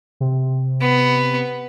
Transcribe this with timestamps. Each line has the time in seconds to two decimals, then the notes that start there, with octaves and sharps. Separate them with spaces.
0.20 C3
0.81 B3